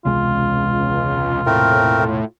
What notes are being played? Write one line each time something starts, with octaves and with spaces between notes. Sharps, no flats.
E1 C#2 C3 G#3 F4
A2 A3 C4 A#4